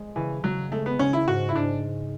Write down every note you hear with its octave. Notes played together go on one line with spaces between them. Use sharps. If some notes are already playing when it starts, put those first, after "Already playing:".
Already playing: G#3
C#3 E3
C#3 F#3
G#3 A3
B3
C#3 C#4
E4
G#2 F#4
E4
G#2 D4